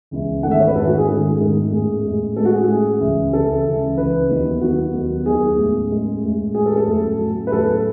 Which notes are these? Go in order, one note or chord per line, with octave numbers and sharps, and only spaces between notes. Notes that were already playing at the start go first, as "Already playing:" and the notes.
C#2 C#3 E3 G#3 C#4
G#2 D#3 A3 C#4 F#5
E5
C#5
B4
G#2 D#3 A3 C#4 A4
F#4
G#4
G#2 D#3 A3 C#4 G#4
G#2 D#3 A3 C#4
A2 G#3 C#4 G#4
A2 G#3 C#4
A2 G#3 C#4 A4
F#4
G#4
F#4
A2 G#3 C#4 G#4
C#2 C#3 E3
C#2 C#3 E3 A4
C#2 C#3 E3
C#2 C#3 E3 B4
D#2 D#3 F#3 B3 D#4
D#2 D#3 F#3 B3 D#4 F#4
D#2 D#3 F#3 B3 D#4
D#2 D#3 F#3 B3 D#4 G#4
A2 G#3 C#4
A2 G#3 C#4
A2 G#3 C#4
A2 G#3 C#4 G#4
A4
A4
A2 F#3 C#4
A2 F#3 C#4
B4
A2 F#3 C#4 A4